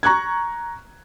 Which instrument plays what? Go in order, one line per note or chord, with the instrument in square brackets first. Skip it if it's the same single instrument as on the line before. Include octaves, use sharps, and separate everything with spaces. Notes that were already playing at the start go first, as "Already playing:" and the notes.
[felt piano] A#5 C#6 F#6 G#6